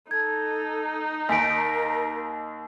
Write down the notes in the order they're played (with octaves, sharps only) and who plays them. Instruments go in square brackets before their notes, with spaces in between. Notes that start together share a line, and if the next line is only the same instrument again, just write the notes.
[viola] D#4 [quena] A4 [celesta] G#6
[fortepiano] D#2 [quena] A#4 [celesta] G#5 B6 D7